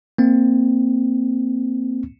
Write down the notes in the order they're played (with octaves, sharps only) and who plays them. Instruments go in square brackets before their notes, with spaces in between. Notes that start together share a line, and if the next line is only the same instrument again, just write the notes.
[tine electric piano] A#3 C4